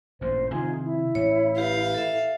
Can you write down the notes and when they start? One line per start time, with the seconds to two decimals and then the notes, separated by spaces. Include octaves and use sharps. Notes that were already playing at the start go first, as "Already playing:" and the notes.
0.21 A1 G2 A#2 C5
0.51 C3 D#3 F3 D#4 F4 G#4
0.84 E4
1.15 A2 E3 C#5
1.57 G4 B4 F5
1.94 A4 E5